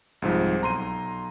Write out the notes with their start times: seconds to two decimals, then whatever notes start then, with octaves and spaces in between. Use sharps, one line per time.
0.22 C2 G#2 F3
0.62 B1 A#5 C6 D#7